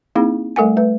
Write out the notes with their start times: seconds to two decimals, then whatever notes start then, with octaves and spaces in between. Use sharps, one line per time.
0.16 A#3 C4 D#4 E4 G#4
0.56 G3 A3 A4 A#4 F#5 G#5
0.77 A3 B4